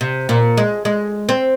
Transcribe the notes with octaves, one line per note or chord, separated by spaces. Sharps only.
C3
A#2
G#3
G#3
C4